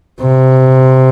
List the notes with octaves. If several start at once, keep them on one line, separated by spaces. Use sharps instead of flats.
C3